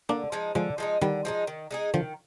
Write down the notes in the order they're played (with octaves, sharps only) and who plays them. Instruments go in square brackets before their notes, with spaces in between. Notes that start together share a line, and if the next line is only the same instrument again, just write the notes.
[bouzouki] D3 [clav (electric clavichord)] A#3 D4
[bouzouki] F3 G#3 D#4
[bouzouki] D3 [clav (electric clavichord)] F3 G#3
[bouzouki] F3 G#3 D#4
[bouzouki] D3 [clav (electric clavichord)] D#3 G3
[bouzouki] F3 G#3 D#4
D#3
G#3 D#4 G#4
[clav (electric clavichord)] D3 F3 [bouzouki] D#3